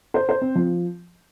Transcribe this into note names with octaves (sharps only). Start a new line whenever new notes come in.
C5
C5
C4
F3